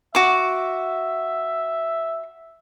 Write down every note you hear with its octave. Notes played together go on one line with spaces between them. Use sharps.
F#4 E5 D6